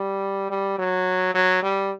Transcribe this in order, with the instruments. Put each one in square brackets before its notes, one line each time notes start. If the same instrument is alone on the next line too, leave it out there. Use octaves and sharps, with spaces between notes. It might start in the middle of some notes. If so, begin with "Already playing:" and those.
Already playing: [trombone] G3
G3
F#3
F#3
G3